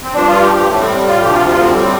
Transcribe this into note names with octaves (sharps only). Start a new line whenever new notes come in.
C4
G2 F3 D4
F4
G4
G4
A2 G3 A3
C4
F4
D2 C3 F3 G4
F4
F4
C4
A2 G3 C4